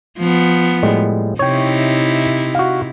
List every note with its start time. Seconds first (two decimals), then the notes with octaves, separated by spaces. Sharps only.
0.18 F3 B3
0.83 A2 G3 G#3
1.39 C3 D#4 E4 C#5 G5
2.55 F#4 F5